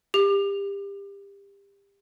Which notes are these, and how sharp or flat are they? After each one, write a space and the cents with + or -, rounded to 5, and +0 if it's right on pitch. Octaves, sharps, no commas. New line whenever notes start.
G4 +30